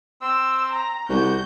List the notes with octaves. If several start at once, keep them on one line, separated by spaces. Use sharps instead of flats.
C4 E6
A#5
C2 F#4 G6